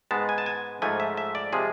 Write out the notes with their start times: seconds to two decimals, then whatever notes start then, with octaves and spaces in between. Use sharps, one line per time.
0.11 G#2 G#3 B3 A5
0.29 G#5
0.38 A5
0.46 G#5
0.82 G#2 F3 A3 G#5
1.00 E5
1.17 E5
1.35 D5
1.52 C3 F3 G#3 G#4